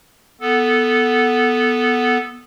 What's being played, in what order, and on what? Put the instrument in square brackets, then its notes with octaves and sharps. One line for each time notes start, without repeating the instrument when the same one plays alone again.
[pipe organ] B3 A4